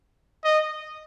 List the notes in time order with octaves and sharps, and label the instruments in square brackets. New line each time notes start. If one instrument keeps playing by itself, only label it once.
[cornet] D#5